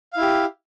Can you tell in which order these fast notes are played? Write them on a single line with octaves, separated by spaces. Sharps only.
F5 E4 G4